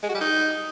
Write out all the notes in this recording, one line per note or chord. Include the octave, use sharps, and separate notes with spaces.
G#3
F#4
G3
D#4